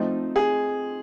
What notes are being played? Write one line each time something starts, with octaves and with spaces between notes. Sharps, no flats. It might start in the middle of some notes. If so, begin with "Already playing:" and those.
Already playing: F3 A3 C4 D#4
G#4